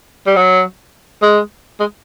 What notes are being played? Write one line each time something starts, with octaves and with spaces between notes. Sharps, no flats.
G3
F#3
G#3
G#3